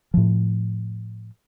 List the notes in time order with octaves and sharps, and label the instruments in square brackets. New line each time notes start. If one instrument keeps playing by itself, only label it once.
[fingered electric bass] A2 F3